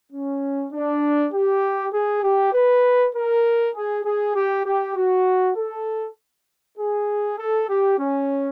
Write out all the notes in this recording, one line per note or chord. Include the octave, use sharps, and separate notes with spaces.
C#4
D4
G4
G#4
G4
B4
A#4
G#4
G#4
G4
G4
F#4
A4
G#4
A4
G4
C#4